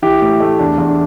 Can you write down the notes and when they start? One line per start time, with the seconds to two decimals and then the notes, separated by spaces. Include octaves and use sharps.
0.02 E3 G4
0.22 A2
0.40 A3
0.59 E2 D4
0.78 E2
0.88 D4